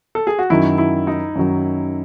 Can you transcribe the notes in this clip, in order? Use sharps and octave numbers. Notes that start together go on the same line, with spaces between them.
A4
G#4
F#4
F#2 D#3 F#3 E4
E4
D#4
F#2 D#3 F#3